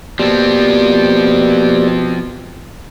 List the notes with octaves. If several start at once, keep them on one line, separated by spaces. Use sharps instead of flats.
B2 F3 A#3 C4 G4 D5